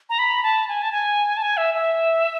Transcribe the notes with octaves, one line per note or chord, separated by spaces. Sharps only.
A#5
B5
A5
G#5
A5
G#5
A5
G#5
E5
E5